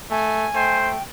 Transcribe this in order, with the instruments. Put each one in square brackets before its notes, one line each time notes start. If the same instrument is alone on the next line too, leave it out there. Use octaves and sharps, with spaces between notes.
[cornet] A3 [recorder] G#5
[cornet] A3 [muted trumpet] C5 [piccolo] G5